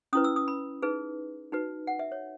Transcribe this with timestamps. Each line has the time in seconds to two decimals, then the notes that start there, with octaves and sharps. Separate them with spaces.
0.13 C#4 E4 B4 D#6
0.24 E6
0.36 D#6
0.48 B5
0.82 D#4 G#4 B4
1.52 D#4 F#4 B4
1.87 F#5
1.99 E5
2.12 C#5